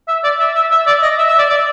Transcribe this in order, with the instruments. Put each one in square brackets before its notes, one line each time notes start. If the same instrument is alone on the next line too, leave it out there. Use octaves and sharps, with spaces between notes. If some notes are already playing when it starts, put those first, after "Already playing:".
[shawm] E5
D5
E5
E5
E5
D5
D#5
E5
E5
D5
D5